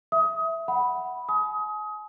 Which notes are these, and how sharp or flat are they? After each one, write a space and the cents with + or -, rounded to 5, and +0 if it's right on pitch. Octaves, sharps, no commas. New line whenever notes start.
E5 +0 D#6 +25
F#5 +5 B5 -5
G#5 +40 D#6 +25